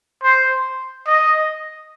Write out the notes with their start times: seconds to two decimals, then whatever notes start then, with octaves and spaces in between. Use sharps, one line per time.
0.23 C5
1.07 D#5